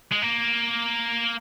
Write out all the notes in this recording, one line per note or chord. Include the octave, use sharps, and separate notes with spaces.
G#3
A#3